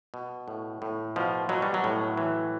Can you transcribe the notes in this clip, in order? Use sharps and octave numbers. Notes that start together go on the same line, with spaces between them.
B2
A2
A2
B2 F3
B2 F#3
G3
F#3
A2
E3